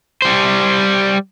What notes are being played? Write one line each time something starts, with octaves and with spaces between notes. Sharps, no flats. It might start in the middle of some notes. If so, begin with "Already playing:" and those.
G3 C5